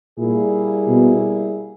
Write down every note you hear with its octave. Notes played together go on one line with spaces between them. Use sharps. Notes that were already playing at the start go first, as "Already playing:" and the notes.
A#2 G3 A#3 E4 G#4
B2